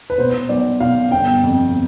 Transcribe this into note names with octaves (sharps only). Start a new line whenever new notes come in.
B4
B2 C5
B1 D5
B2 F5
G1 G5
F2